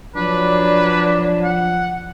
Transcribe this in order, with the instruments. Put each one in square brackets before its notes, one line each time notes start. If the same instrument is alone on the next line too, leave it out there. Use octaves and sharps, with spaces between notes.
[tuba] F3 [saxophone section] F#3 D4 [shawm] B4
[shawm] F#5